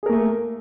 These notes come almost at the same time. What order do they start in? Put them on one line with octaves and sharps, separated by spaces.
G#4 A#4 A#3 A3